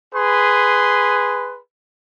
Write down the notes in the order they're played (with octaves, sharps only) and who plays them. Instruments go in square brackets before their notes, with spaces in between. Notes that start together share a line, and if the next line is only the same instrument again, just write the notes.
[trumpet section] G#4 B4 C6